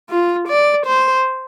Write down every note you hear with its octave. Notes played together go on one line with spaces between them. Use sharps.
F4
D5
C5